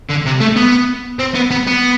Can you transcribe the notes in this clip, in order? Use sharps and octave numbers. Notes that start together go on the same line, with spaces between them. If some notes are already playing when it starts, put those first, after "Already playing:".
D3
C3
A3
B3
C4
B3
B3
B3